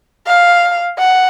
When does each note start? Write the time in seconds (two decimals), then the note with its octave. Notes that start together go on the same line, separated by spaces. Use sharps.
0.27 F5
0.98 F#5